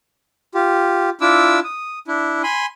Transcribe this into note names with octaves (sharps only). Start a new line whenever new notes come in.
F4 G4
D4 E4 F4 D6 E6
D#6
D4 E4
G#5 B5 C6